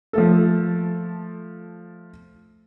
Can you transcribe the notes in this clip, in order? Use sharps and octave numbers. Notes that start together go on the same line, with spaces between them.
F3 A3 A4